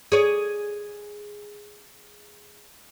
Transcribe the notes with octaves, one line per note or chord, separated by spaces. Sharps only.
G#4 C#5 D5